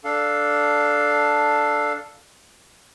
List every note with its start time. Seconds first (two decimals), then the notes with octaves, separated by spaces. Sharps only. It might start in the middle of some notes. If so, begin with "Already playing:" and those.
0.04 D4 A4 F5